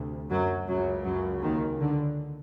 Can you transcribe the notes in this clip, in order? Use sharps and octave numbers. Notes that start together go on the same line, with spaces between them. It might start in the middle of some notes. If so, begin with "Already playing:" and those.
Already playing: D2 C3
F#2 F#3
C#2 F#2 C#3 F#3
F#2 F#3
D#2 D#3
D3